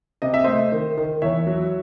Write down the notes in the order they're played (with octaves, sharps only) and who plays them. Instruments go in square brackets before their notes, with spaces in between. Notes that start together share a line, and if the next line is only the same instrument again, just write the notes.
[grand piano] C3 D#5
E5
A3 C5 D#5
D#3
D#3
E2 C#5 E5
F#3